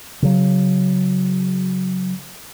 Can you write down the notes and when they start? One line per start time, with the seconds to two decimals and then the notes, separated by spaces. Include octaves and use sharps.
0.22 C#3 F#3